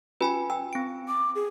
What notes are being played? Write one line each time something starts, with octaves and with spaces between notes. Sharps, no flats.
C#4 F4 B4 G#5 B5
G5 E6
C4 D7
D6
G#4